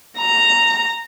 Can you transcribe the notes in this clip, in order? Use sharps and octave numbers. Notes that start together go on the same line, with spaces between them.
A#5